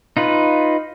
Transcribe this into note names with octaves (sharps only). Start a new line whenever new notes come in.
D#4 F4 B4